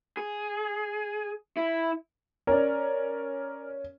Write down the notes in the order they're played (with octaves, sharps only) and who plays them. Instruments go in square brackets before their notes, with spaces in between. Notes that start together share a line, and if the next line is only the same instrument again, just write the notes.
[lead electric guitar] G#4
E4
[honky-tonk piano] C#4 [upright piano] A#4 D5